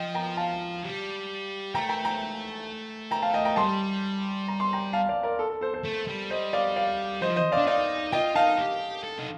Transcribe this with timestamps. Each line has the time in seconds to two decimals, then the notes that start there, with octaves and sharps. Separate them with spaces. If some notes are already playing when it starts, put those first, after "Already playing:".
Already playing: F3 D#5 G5
0.15 G5 A#5
0.37 F5 A5
0.83 G3
1.74 A3 G5 A#5
1.89 G5 A#5
2.05 G5 A#5
3.11 G5 A#5
3.22 F5 A5
3.34 D#5 G5
3.45 G5 A#5
3.56 G3 A5 C6
4.48 A#5
4.60 C6
4.73 G5 A#5
4.93 F5 A5
5.09 D5 F5
5.23 A#4 D5
5.39 A4
5.50 A4
5.61 A4 C5
5.74 A4 C5
5.84 A3
6.07 G3
6.30 C5 D#5
6.53 D5 F5
6.76 D5 F5
7.21 F3 C5 D#5
7.36 C5 D#5
7.52 D5 F5
7.58 D4
7.67 D#4 D5 F5
8.12 F4 D#5 G5
8.35 D#4 F5 A5
8.59 G4
9.04 A4
9.19 D#4